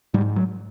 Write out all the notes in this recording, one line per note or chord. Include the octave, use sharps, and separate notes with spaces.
G#2 G3
F#3